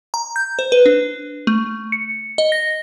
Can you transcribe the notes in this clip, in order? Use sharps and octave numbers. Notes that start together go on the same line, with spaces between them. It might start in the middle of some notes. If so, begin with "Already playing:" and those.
A#5
G6
C5
B4
D4
A3
C#7
D#5
A#6